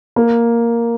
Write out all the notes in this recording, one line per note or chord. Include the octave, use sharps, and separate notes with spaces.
A#3